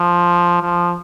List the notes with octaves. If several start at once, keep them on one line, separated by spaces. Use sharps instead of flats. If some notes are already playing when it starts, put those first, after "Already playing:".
Already playing: F3
F3